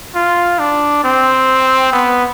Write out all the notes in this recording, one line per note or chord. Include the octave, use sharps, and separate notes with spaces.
F4
D4
C4
B3